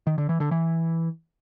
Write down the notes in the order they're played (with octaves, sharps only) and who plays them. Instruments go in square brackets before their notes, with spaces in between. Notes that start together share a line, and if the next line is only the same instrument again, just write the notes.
[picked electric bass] D#3
D3
E3
D3
E3